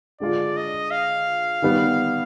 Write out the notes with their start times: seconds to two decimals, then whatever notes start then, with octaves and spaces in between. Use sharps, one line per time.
0.20 D3 G#3 D4 F4 D5
0.57 D#5
0.91 F5
1.62 D#3 G3 B3